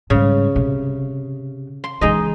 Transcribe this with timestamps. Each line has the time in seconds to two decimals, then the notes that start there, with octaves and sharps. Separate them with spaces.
0.10 G#2 C#3 G3
0.56 C3
1.84 C6
2.01 C#3 E3 G#3 D#4 D#5